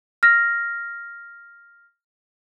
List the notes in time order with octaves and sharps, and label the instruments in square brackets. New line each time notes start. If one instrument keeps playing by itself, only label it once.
[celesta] F6 A#6